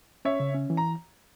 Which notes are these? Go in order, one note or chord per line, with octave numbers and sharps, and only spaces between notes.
C#4 C#5 E5
C#3
C#4
E3
A#5